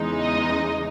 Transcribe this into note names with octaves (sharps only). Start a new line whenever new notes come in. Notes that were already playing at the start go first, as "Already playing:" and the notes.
Already playing: E2 C#3 E3 G#3 D#4
D#5